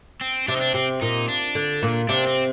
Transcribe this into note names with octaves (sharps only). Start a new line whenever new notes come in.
C4
C3 D4
D#4
D4
C3 C4
A#2 D#4
D4
D3
A#2
C3 D4
C4